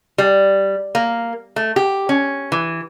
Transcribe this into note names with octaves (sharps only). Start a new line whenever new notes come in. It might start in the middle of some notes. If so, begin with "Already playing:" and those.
G3
A#3
A3
G4
C#4
E3